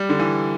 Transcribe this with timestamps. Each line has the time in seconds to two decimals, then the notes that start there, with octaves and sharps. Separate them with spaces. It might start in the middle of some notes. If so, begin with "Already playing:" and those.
Already playing: G3
0.09 D3
0.19 E3